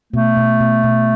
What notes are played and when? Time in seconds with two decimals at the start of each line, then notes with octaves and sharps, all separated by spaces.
0.13 B2 A3
0.37 B2
0.60 B2
0.84 B2